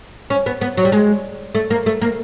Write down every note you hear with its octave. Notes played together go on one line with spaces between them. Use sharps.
C#4
B3
B3
F#3
G3
G#3
A3
A#3
A3
A#3